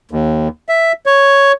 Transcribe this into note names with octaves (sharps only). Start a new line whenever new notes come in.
D#2
E5
C#5